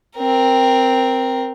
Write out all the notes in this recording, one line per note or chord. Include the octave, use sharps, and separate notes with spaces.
C4 A#4